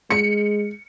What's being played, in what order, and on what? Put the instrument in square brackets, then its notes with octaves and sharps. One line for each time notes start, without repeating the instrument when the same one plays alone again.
[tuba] G#3 [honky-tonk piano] C#7